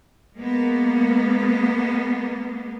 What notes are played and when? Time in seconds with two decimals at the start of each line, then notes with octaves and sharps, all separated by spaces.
0.36 G#3 A#3 B3